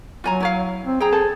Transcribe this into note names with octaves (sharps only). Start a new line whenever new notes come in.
F#3 F4 G#5 A#5
E4 C#5 F5
C4
G#4 G5 A#5
A4 C5 A5